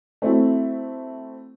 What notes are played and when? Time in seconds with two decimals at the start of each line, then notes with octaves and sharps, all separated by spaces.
0.22 A3 C4 E4 F#4